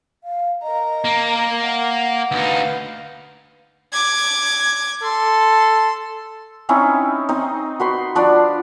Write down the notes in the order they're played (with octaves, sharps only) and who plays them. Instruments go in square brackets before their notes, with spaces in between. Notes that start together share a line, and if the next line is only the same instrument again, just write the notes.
[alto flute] F5
[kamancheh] A#4 A#5 [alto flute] D#5
[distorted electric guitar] A#3
[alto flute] F#5
[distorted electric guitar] D2 D#4 [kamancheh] B4 F5
[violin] D6 G#6
[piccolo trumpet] A4 [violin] C6
[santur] C4 C#4 D#4 E4
C4 D#4
F#4 B4 C6
F3 D4 F#4 D5